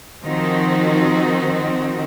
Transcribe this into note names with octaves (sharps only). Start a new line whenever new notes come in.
D#3 F3 C4 D#4 F#4